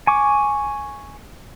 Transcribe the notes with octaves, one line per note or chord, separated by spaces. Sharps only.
G#5 C#6 D6